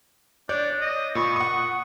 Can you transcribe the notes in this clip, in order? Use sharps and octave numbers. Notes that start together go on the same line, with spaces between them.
D4 C#5 D5 G6
D#5
A#2 B5 C#6 D#6
F#5 C#6 D#6